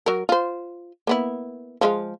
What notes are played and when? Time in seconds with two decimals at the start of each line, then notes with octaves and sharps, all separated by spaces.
0.06 F#3 A#4
0.29 F4 C5
1.07 A#3 B3 E4
1.81 F3 G#3 F5